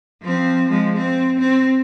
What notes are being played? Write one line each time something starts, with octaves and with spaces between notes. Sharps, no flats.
F3 C4
F3 G#3
C4
C4